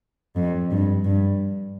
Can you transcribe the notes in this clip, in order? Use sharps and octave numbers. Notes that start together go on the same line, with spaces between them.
F2
G2
G2